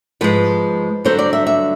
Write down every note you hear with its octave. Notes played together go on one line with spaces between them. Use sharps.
G#2 F3 G#3 B4
G2 D3 F#3 C5
D5
E5
E5